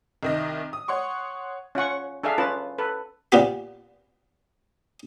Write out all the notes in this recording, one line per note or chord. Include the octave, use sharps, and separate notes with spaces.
C2 D#3 D#5
D#6
C#5 F#5 C6 C#6
C#4 F4 F#5 C#6
D4 G#4 A4 E5 F5
C#4 F4 B4 A5
A4 B4
A#2 B3 G4